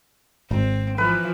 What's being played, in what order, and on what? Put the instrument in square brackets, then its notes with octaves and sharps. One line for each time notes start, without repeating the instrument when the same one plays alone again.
[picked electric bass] G#1 [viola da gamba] C4
[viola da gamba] E3 F3 [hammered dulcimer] B4